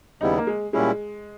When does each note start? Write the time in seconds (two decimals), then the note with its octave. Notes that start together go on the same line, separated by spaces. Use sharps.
0.21 D#2 C#3 G3 B3 D#4 E4
0.38 A#3
0.47 G#3
0.73 A#2 G3 G#3 C#4 E4